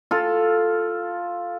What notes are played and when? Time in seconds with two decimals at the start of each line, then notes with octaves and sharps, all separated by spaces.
0.11 F4 A4